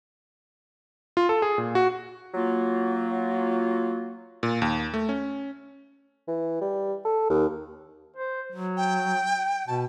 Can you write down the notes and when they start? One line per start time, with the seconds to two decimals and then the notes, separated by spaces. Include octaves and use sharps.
1.17 F4
1.29 A4
1.42 G#4
1.58 A#2
1.75 F#4
2.34 F#3 A#3 F4
4.43 A#2
4.62 D#2
4.94 A3
5.09 C#4
6.28 E3
6.61 G3
7.05 A4
7.30 D#2
8.16 C5
8.52 F#3
8.77 G5
9.68 B2 A5